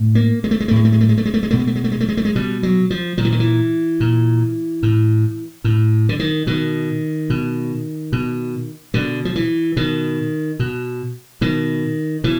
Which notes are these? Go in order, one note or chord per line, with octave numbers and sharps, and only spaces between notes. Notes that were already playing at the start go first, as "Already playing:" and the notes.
Already playing: A2
A#3
G#3
A3
G#3
A3
A2 G#3
A3
G#3
A3
G#3
A3
G#3
A3
G#3
B2 A3
G#3
A3
G#3
A3
G#3
A3
G#3
A3
G#3
B2 G3
F#3
F3
A#2 F3
E3
D#3
E3
A#2
A2
A2
D3
D#3
B2 D#3
B2
B2
B2 D3
F3
E3
B2 D#3
B2
B2 D#3
B2 E3